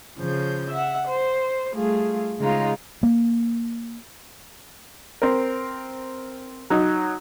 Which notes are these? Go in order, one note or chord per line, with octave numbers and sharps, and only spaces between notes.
C#3 F3 G6
E5 F#5
C5
G3 A3 F4 G#4
C#3 G#3 D#4 F4
A#3
C4 A#4
F#3 D#4